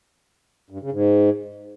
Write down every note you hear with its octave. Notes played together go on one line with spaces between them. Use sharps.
G2
C#3
G#2